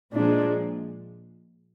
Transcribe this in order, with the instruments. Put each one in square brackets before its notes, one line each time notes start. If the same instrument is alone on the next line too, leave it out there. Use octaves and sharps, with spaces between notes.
[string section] A#2 F3 G#3 [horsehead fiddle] D4